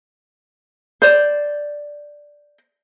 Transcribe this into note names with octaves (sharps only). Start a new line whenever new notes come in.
C5 D5